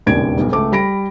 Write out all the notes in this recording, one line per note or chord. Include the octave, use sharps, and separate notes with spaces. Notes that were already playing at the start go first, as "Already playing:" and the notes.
E1 A#1 D#2 C#3 G#6 D7
B1 G2
C#2 A3 D6
G3 B5 A#6 D7